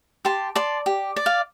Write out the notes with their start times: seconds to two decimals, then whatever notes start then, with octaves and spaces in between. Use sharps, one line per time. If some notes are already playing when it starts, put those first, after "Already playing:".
0.25 G4 A5 C6
0.55 D5 A5 C6
0.86 G4
1.16 D5
1.26 F5